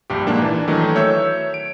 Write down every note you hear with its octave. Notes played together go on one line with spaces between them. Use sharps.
A#1 G2 G4
G#2 A#3 D4
E3 D4
D#3 E3 F#3 A3 D#4
C#5 E5 E6 G6
D7